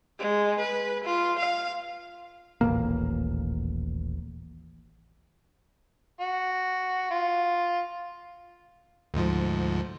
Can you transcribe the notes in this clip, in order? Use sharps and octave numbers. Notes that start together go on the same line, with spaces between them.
G#3
B4
F4
F5
D#1 A1 B2 A#3
F#4
F4
D2 G#2 F3